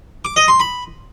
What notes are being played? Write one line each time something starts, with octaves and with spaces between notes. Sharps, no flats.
D6
D#5
C6
B5